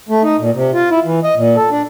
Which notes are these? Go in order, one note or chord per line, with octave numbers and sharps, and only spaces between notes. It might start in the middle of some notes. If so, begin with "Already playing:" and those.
A3
D#4
A#2
C3
F4
E4
E3
D#5
A#2
A4
D4